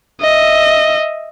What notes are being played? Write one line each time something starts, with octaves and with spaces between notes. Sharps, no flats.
D#5 E5